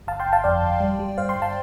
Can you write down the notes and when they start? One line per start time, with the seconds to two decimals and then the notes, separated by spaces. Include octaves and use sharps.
0.07 G1 F5 A5
0.20 G5 C6
0.27 G1
0.32 F5 A5
0.44 F2 D5 G5
0.63 G1
0.80 G3
0.99 G3
1.18 G2 C5 F5
1.29 G5 C6
1.36 G2
1.42 F5 A5